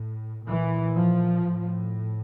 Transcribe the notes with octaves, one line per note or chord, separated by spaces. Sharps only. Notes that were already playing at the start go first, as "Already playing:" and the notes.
Already playing: A2
A#2 E3
F3
A2